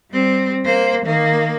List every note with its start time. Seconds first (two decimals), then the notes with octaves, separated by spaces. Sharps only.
0.11 G3 C4
0.65 A#3 C5
1.05 D#3 A#3